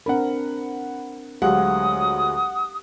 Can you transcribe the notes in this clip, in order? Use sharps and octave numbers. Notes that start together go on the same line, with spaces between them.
C4 D4 A#4 F#5 B5
D2 F#3 G#3 G4 F5 F#5 D#6